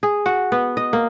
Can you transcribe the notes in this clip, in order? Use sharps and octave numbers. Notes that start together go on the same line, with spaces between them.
G#4
F#4
B3
D#5
A#3